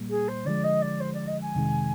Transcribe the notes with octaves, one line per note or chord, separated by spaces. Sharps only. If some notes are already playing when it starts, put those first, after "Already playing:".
Already playing: A#2 G3 A#3
G#4
C5
D3 F3 G#3 D5
D#5
D5
C5
D5
D#5
G#5
F2 C3 D#3 G#3